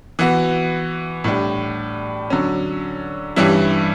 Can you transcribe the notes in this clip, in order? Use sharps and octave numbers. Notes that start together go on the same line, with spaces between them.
E3 B3 F#4
A2 G3 D4
D3 F#3 C#4
G2 E3 G3 C#4 E4